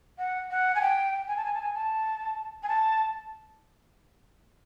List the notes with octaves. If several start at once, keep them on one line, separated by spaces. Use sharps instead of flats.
F#5
F#5
G#5
G5
G#5
A5
G#5
A5
G#5
A5
G#5
A5